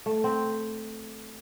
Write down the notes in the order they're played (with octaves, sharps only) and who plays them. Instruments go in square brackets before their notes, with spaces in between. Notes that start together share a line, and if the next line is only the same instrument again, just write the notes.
[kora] A3
C4